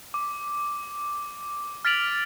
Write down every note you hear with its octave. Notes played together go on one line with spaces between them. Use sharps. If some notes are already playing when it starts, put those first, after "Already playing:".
D6
F6 A6 B6 D7 F7 F#7